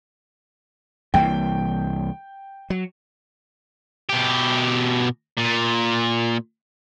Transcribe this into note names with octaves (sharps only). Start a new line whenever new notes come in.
C2 E3 A#3 G5
F#3
B2 G4
A#2